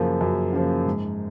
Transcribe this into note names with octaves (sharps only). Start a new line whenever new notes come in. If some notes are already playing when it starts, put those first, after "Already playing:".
Already playing: F#2 C#3 F3 A#3
F#2
C#3 F3 A#3
G#2